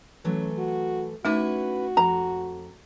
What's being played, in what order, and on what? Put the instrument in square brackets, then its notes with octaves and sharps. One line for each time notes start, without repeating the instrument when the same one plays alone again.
[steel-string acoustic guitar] E3 F#3 A3 [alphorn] C#4
[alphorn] F#4
[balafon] A3 D#4 D6 [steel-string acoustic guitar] C#4 E4 B4 [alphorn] F#4
[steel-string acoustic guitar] F2 [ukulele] A#5